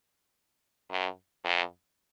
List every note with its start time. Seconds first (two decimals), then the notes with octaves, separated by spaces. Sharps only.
0.90 F#2
1.45 F2